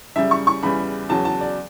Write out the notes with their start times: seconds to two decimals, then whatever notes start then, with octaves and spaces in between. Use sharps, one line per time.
0.15 F#2 C#3 G3 E5
0.31 C#6
0.47 C#6
0.63 E2 C#3 E3 G3 B5
1.09 E2 C#3 F#3 A5
1.25 A5
1.41 D5